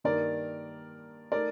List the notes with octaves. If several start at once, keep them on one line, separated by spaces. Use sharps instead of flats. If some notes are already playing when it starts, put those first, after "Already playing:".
G2 D#3 A#3 D#4 A#4 D5
A3 D#4 A#4 D5